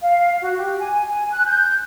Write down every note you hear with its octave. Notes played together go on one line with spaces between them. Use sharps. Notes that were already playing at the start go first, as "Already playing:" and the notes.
F5
F#4
G4
G#5
G#5
F#6
G6